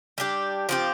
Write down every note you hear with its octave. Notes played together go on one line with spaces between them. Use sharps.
G3 D4 G4
F3 C4 G4